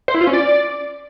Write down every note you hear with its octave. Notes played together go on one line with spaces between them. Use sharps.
C5
E4
F4
C#4
D5